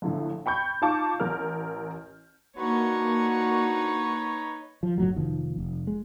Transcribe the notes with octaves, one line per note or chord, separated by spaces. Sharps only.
A#1 A2 D3
G5 B5 C#6 G6
D#4 F4 F5 A5 C#6 D6
A1 A#4 F6
A#3 D4 D#4 F#4 B4 C#5 F#5 C#6
F3
F#1 A2 F#3
F1 D#3 F3
F1
G#3